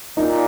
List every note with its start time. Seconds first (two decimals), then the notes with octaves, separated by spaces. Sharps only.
0.17 A#2 D#4